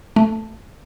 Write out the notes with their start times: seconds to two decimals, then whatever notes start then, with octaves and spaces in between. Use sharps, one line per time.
0.16 A3